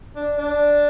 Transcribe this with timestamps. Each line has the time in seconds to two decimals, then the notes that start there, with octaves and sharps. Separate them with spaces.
0.16 D4
0.38 D4